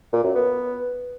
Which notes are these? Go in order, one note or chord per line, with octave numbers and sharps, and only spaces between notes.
A#2
F#2
B3